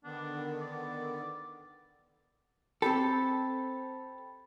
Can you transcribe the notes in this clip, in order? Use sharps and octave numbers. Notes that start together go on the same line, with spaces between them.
D3 D#3 B3 D4
D5
C4 G4 A4 G5 B5 A6